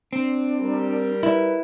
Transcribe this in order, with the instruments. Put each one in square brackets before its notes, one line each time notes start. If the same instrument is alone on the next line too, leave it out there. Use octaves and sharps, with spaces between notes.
[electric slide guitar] C4 [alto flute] D4
[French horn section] G3 A#4
[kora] E4 [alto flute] B4